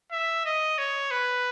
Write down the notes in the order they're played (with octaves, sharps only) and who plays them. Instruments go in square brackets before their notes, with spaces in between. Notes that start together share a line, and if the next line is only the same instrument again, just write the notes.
[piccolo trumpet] E5
D#5
C#5
B4